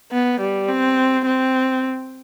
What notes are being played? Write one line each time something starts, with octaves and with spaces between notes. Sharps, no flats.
B3
G3
C4
C4